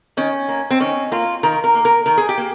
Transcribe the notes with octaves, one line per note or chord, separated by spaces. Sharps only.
D#3 C#4
A#3
C4
D#3 C#4
A#3 F4
D#3 A#4
A#4
A#3
A#4
D#3 A#4
G#4
G4
A#3